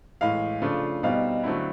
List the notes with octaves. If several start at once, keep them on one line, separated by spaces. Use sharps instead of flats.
A2 E3 G#3 F5
C#3 F3 A3 D4 F4
B2 G3 C4 D#4 F5
D3 F#3 A3 C4 E4